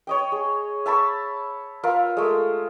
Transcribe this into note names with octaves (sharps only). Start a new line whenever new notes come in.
C#5 D#5 G5
G#4
E5 A5 B5 C#6
F4 A#4 E5 F5
G#3 A3